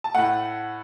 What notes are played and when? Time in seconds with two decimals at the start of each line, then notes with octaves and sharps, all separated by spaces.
0.04 A5
0.15 A2 A3 F#5